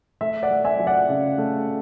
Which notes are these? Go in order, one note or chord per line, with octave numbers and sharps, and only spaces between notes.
A3 E5
D5 F#5
A3
E5 G#5
F#3
D5 F#5
C#3
A3